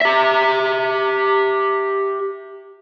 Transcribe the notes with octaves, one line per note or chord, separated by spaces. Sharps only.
G4 E5